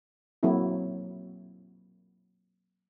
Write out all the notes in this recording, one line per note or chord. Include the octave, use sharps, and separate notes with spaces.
F#3 A#3 C4 E4 F#4